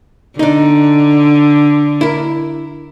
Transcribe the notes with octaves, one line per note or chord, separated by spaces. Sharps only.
D3 D4 D#4
E4 A#4